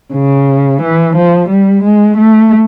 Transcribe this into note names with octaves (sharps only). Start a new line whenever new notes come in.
C#3
E3
F3
G3
G#3
A3